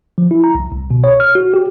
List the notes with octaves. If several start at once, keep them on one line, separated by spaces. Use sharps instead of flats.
F3
E4
A#5
C2
C2
B2
C#5
F6
F#4
G4